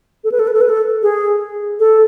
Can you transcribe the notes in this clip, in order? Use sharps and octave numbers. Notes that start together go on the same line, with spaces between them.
A4
B4
A4
B4
A4
B4
A4
G#4
A4